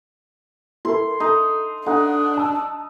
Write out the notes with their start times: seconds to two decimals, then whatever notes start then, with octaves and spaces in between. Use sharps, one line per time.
0.85 E4 A4 A#4 C6
1.20 D#4 A4
1.86 D4 D#4 A4 F#5 F#6
2.37 A5 D#6 E6